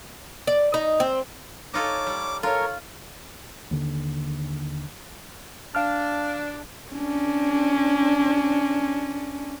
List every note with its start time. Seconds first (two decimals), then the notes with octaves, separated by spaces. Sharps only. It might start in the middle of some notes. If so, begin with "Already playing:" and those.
0.47 D5
0.74 D#4
1.00 C4
1.74 D#4 F4 A4 C#5 D6
2.07 G3
2.43 F4 A4 A#4 C#5
3.71 D#2 D3
5.75 D4 F5 F6
6.92 C#4 D4